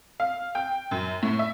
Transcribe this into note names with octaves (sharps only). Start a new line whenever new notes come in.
F5
G5
F#2
A2
E5